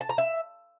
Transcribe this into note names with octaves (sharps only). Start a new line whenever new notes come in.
A5
A#5
E5